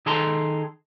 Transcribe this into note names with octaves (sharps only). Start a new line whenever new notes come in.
D#3 G#4 A4 A5 A#5 C6